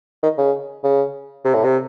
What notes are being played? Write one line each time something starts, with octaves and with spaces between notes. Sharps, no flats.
D#3
C#3
C#3
C3
A2
C3